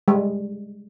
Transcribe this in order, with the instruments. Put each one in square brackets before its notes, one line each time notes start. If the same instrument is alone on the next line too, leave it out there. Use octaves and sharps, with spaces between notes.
[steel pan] G3 G#3